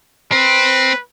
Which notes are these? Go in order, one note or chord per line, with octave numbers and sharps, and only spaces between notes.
C4 B4